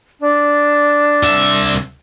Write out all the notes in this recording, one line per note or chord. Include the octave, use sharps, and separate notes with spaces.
D4
C2 E5